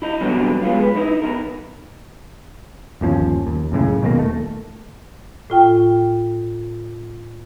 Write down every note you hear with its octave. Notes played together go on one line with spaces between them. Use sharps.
E4 D#5
B2 D3 F#3 G3 B3 C4
G#3 B3 F4
B4
D#4 E4
B3 D#4 A#4
G1 D#2 F3 C#4
D#2
C#2 F#2 A2 C#3
B2 D#3 E3 A#3
D#1 A3
A2 F4 G5